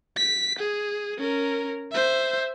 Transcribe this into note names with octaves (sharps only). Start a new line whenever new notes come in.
B6
G#4
C#4 A#4
C5 E5